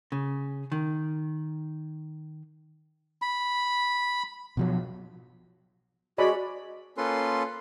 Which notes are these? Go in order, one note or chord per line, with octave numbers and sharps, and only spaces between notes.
C#3
D#3
B5
B2 F3 F#3
G#3 F#4 C#5 D5 B5
A#3 C#4 F4 A4 B4 C6